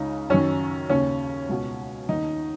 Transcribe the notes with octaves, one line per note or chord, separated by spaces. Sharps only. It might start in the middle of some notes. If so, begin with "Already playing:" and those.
Already playing: C#2 C#3 D#4
F#2 D#3 C#4
D#2 C#3 C#4
C#2 B2
D#2 D#3 D#4